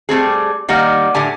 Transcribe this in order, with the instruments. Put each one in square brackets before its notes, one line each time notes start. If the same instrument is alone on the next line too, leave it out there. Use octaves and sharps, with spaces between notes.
[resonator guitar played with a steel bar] G3 A3 C4 G#4
D#3 G3 A#3 D#5 F#5
A2 D3 G4 G#5